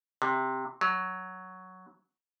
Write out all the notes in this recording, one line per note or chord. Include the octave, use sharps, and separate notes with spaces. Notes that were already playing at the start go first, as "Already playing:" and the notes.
C3
F#3